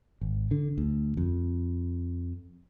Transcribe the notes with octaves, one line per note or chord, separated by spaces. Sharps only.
G#1
D3
D2
F2